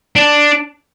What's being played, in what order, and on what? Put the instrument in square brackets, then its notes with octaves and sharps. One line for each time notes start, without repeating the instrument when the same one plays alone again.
[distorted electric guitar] D4